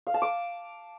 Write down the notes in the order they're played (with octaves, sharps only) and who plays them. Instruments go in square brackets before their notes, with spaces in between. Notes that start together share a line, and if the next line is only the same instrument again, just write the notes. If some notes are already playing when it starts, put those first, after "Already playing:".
[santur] F5
A5
D6